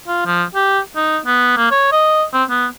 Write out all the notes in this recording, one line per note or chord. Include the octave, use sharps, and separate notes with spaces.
F4
F3
G4
D#4
B3
A#3
C#5
D#5
C4
B3